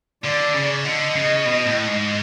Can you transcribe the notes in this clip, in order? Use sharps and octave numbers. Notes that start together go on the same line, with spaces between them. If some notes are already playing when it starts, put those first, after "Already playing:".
D3 D5
C#3
D3 D#5
C#3
B2
A2
G#2